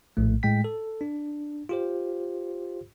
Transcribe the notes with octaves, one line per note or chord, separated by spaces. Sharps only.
A#1 A2 A3
A2 G#3 G5 B6
A4
D4
F4 G4 C5